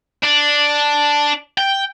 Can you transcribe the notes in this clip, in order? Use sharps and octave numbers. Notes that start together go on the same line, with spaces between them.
D4
G5